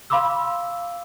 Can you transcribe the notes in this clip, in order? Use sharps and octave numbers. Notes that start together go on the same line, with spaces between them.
F5 B5 C6 D6 E6